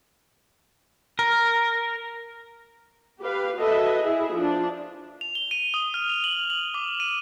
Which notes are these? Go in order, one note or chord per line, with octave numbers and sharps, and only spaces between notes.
A#4
G4 B4 F5
F#4 A4 B4 D#5 E5
E4 G#4 E5
F3 D4
F7
G7
D#7
D#6
F6
F7
F#7
F#7
D6
D#7